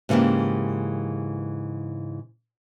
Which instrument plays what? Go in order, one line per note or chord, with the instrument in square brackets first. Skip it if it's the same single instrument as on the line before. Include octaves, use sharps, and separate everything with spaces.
[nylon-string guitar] G#2 C#3 E3 A#3 G4